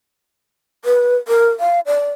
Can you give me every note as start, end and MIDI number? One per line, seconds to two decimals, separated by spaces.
0.85 1.14 71
1.28 1.49 70
1.60 1.80 77
1.86 2.12 74